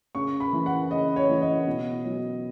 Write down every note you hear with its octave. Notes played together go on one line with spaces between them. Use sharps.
C#3 C#6
B5
E3
F#5
C#3 D#5
C#5
E3
D#5
B2
F#3